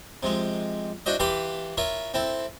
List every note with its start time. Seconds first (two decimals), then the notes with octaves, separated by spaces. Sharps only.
0.23 C3 F3 G#3
1.06 D4 E4 F#4 C5 D#5
1.20 E3 G4 F5 A5 B5 C6
1.77 E4 F4 A#4 C#5
2.14 C4 E4 A4